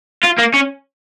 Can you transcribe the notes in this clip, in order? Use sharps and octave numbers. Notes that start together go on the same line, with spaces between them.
F4
A#3
C#4